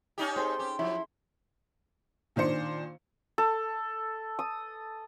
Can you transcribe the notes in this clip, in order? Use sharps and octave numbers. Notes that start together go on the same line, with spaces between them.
C#4 D#4 G4
C4 G#4 A4 C6
C#4 G4
F3 F#3 E4
A#2 D#3 D4 C5 C#7
A4
D#6